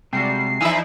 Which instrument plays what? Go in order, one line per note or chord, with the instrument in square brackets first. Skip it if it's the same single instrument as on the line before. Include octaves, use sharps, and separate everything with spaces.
[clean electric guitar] C3 G#3 F#4 [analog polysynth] G3 [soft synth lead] C7
[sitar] E2 E5 [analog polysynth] F3 D#4 E4 [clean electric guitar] G#5 B5